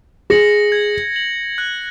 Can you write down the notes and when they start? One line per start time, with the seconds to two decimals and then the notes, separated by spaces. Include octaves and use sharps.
0.30 G#4 A#6 C#7 F#7
0.72 G#6
1.16 F#7
1.58 F#6